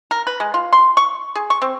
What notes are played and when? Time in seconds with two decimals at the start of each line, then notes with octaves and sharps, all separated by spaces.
0.11 A#4
0.27 B4
0.40 G#3
0.54 F4
0.73 C6
0.97 C#6
1.35 G#4
1.50 C#6
1.62 C4